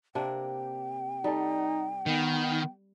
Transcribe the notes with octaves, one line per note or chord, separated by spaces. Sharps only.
C3 A#3 D4 G5
G3 D#4 A4
D#3 B3